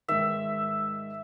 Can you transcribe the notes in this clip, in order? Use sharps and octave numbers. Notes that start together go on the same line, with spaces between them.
G#2 D#3 E5